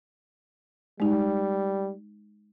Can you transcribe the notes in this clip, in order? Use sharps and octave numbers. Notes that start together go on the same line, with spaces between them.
G3 G#3 D#4